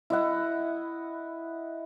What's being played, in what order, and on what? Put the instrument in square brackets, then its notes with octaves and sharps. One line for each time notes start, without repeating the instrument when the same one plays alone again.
[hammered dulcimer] E4 D#5 F#5